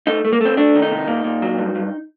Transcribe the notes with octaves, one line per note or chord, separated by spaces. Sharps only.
A3 D#4
A3
A#3
A3 C4
A3 D4
D#3
D#4
C3
A#2
A#2
F#3
G2
G2